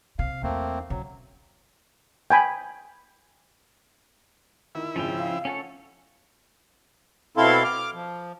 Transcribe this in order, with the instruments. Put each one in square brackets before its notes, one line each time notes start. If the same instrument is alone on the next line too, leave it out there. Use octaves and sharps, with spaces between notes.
[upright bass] C3 [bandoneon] F5
[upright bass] E2 [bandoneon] A3 A#3 C4
[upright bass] C#3 [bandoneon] F#3
[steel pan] G5 G#5 B5
[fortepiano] D#3 [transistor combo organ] E4
[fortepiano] G#1 C#3 [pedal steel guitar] F3 C#4 G5
[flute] F5
[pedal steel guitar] C#4 A4 C#5 [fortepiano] F#5 G#5
[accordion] B2 C4 E4 A4 F5 C6
D6 F6
F3